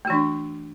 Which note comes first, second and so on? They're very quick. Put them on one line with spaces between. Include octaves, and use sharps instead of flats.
A3 F#4 E3 D4